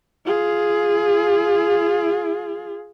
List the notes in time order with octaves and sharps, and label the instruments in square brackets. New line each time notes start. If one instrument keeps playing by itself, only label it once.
[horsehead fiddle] F4 G#4